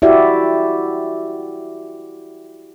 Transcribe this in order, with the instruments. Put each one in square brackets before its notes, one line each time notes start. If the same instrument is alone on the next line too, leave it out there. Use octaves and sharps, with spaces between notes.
[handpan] E4 F#4 G4 D5 E5